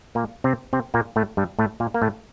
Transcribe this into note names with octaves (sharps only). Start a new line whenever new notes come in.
A#2 A#3
C3 C4
C3 C4
A#2 A#3
A2 A3
G2 G3
A2 A3
A#2 A#3
A#3
A2 A3